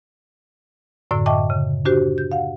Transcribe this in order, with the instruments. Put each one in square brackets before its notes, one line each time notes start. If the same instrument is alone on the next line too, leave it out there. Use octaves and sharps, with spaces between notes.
[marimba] F#2 A2 D3 D5 E6
D#5 E5 G5 A5 C#6 D6
C#3
D4 F#4 G4 C5
G6
F5 F#5